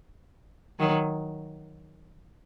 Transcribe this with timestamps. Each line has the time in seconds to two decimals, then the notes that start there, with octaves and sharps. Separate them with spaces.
0.79 D#3 F#3